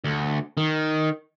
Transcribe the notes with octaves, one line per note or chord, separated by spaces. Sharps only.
D2
D#3